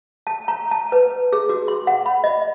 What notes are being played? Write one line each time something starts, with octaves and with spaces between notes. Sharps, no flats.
A5
A#5
A5
B4
G#4
F#4
C6
F#5
B5
D#5